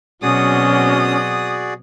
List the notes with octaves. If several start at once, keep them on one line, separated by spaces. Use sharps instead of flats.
B2 F#3 C4 C#4 F#4 G#4 D5 D#6